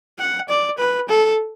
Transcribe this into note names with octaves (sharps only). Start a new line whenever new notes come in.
F#5
D5
B4
A4